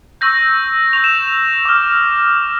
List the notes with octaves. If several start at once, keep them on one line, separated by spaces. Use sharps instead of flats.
C#6 E6 G6 A#6
C#6 G6 F7
E7
F7
D6 F6